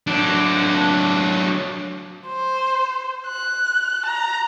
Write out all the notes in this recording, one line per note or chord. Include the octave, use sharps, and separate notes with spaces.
F#3 D4
C5
F#6
A#5